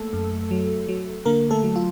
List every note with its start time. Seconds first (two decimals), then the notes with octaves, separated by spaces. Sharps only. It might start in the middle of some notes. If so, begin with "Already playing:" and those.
Already playing: A3 A#3 A4
0.13 F#2
0.51 F#3
0.88 F#3
1.25 D3 A#3 A#4
1.51 A3 A4
1.63 F#3
1.76 F4